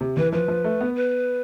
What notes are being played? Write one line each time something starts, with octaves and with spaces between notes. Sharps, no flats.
C3
E3 B4
F3 B4
F3
A3
B3
B4